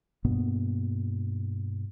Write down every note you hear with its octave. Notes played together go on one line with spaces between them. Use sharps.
G2 B2 A#3 B3